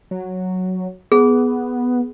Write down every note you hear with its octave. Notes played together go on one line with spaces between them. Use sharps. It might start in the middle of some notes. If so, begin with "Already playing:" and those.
F#3
B3 G#4